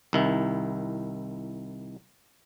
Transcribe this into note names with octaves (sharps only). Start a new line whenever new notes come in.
C2 D#3 E4